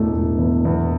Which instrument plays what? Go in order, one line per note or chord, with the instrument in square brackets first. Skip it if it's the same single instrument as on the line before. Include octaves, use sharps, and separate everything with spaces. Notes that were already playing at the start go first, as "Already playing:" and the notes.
Already playing: [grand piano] E1 A3 [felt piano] A2
[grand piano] E1
E2
E2